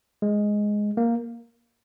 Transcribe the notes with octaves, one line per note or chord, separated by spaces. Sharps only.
G#3
A#3